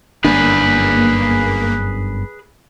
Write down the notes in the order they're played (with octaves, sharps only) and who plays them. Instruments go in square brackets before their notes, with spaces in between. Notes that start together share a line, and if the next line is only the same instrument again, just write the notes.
[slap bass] G1 F#2 D4 [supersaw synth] A#3 [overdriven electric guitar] G#4 B4